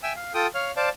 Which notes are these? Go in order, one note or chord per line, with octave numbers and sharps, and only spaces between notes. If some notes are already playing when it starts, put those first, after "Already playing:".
E5 G5 G#5 E6
F5
F4 A4 G5 D#6
C#5 F5 F6
C5 D5 F5 A5